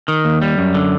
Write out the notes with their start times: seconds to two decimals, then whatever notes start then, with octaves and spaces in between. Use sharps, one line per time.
0.08 D#3
0.25 D#2
0.42 G3
0.58 F#2
0.74 D3